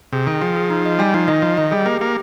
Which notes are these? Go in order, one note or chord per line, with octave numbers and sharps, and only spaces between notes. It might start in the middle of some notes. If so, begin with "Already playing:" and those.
C3 G#4
D#3 G5
F3 G#4
G#4
D#4
D#5
G3 G#5
F3 D#4
D#3 D#5
F3 D#5
D#3 D#5
G3 G#4
A#3 G4
A#3 G4